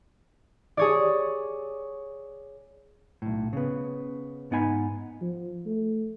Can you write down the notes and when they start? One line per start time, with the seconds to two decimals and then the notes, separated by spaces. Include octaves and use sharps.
0.77 G#4 C#5 D5
3.22 B1 A2
3.53 C#3 B3
4.51 G#2 B3 D#4 G#5 B5
5.21 F3
5.66 A3